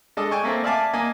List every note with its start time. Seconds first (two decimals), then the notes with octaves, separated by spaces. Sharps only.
0.17 G#3 D4 A4 D#5
0.31 G5 G#5 C#6
0.43 A3 A#3 C4
0.64 D5 E5 F5 G#5 A5 D6
0.93 A#3 D#5 G#5